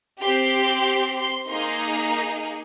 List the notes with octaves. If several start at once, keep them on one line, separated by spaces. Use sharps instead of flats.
C4 G4 C6
C6
A#3 D#4 G#4 C6
A#5